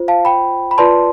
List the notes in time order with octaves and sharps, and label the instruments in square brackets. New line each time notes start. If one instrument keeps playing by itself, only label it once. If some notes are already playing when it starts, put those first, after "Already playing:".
Already playing: [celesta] F4 C5
F5 A5
G5 B5
B5
F4 B4 D5 A5 C6